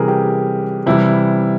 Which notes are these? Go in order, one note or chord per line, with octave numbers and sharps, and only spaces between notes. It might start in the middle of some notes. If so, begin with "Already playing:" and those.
Already playing: C3 E3 G3 G#4 A#4
G4
C3 E3 G3 E4